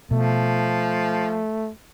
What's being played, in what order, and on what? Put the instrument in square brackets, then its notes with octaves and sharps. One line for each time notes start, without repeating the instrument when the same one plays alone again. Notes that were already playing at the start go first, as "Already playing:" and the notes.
[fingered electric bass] B2 [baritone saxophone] F3 [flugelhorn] A3